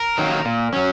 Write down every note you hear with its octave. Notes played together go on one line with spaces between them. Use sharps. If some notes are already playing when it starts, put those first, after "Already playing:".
Already playing: A#4
D#3 F#3 A#3
A#2
F#3 C#4